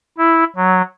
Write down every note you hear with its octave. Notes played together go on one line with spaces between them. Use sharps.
E4
F#3